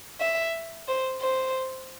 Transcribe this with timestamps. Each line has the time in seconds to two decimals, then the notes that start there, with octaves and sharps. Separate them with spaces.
0.20 E5
0.88 C5
1.21 C5